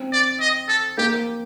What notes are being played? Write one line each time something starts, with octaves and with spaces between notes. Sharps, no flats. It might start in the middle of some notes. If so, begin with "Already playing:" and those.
Already playing: C4
D5
D#5
A4
A#3 G4